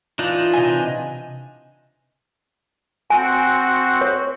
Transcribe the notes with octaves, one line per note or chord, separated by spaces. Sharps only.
E3 D4 D#4 F4
C3 D#5 G#5
C4 F#4 G#5
C#5